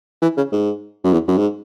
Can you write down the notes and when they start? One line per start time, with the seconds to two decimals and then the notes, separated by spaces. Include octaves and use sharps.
0.22 E3
0.37 C#3
0.52 G#2
1.04 F#2
1.12 E2
1.28 F#2
1.37 G#2